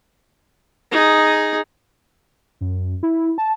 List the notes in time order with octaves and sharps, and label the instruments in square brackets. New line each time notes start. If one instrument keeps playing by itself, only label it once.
[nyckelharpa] D#4 G#4
[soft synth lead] F#2
E4
A5